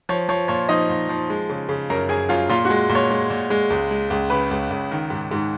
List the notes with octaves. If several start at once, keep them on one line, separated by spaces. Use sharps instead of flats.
F3 C#5
F3 C#5
A#2 C#5
F3 D#4 D#5
A#2
F3
G#3
C#3
C#3
F#2 A#4 A#5
F#2 G#4 G#5
F#2 F4 F5
A#2 F4 F5
F#4 F#5
G#3
A#2
C#5
G#3
A#2
G#3
C#2
G#3
C#2
C#3 B4
C#2
C#2
D#3
G#2
G#2